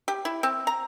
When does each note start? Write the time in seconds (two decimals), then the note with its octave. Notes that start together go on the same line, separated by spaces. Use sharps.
0.08 G4
0.25 E4
0.43 C4
0.67 A#5